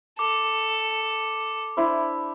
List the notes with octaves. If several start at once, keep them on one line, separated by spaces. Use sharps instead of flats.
A4 D6
D4 E4 C5